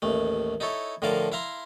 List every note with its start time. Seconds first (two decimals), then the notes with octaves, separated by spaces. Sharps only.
0.02 A1 D#2 A3
0.60 D#4 E4 A4 C#5
1.02 A2 D3 F3 A#4 F5 A5
1.32 E4 E5 F5 A#5 C6